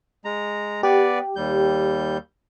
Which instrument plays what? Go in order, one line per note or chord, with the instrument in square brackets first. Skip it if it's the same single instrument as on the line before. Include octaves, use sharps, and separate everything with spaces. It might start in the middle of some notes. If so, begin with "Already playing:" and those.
[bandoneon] G#3 A#5
[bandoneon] B3 B4 D5 [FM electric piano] G4
[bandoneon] D#2 G3 G6